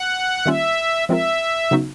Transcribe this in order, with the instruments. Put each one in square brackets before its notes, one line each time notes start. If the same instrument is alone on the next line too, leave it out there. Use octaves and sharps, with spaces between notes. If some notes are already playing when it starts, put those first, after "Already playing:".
Already playing: [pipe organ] F#5
[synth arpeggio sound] D#3 G3 A#3 C#4 F4 [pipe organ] E5
[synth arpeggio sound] F3 G#3 C4 F4 A#4 [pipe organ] E5
[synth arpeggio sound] C#3 F#3 B3 D#4 F#4